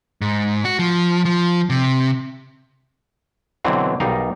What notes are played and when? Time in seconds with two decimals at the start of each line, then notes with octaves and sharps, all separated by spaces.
0.21 G#2
0.65 F#4
0.79 F3
1.25 F3
1.70 C3
3.65 B2 D3 E3 F#3 C4
4.00 B1 G3 D#4 A#4 F5